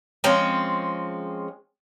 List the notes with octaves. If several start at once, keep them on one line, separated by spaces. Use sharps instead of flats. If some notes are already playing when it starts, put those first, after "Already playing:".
F3 G#3 C4 C#4